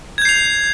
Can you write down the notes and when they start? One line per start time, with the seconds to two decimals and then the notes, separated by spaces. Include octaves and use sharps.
0.18 G#6
0.22 G6
0.25 C7
0.29 F7